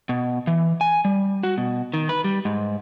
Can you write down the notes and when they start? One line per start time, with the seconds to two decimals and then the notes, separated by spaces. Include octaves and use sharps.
0.09 B2
0.47 E3
0.81 G#5
1.05 G3
1.43 F#4
1.58 B2
1.94 D#3
2.09 B4
2.24 G3
2.45 G#2